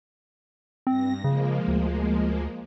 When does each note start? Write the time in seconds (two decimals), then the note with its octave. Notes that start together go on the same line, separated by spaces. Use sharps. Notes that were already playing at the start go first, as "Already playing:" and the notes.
0.87 G2 C4 A#6
1.24 C#3 F3 G#3 A#3
1.68 D2